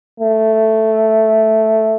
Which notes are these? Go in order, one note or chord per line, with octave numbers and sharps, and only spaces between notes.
A3